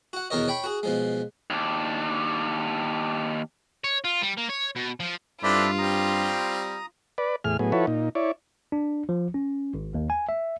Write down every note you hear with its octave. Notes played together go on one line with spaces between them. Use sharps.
F#4 F#5
E2 B2 D#3 A#4 C#5 D#5
C#5 G5 B5 C#6
F#4 G#4
B2 F3 G#3
D#2 D4
C#5
F4
G3
A#3
C#5
B2
F3
G2 C4 D4 E4 F4 A4 B4 D5
G3 C4 G4 A#5 D#6
B4 D5
E2 A2 G#4 F6
A2 F#3 B3 G#4
F3 E4 F#4 A4 B4 C#5
A#2 D#4
E4 C#5 D5
D4
F3
C#4
G#1
D#2
G#5
E5